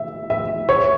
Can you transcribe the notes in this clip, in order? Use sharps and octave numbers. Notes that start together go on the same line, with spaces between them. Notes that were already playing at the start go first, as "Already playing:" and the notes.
Already playing: E5
E5
C#5